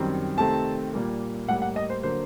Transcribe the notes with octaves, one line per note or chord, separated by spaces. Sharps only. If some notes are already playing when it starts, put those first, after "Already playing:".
Already playing: F#2 D#3 G3 C4
C3 D#3 A3 C4 A5
A#2 G3 A#3
A2 G3 A#3 F#5
F#5
D#5
C5
D3 F#3 A#3 C5